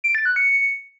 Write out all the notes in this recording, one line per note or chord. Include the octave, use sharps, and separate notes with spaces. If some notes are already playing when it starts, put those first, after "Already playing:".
D7
A6
F#6
C#7